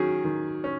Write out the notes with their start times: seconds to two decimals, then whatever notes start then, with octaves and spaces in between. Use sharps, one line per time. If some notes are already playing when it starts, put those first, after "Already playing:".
Already playing: D#3 F#3 C#4 G#4
0.24 D#3
0.64 C#4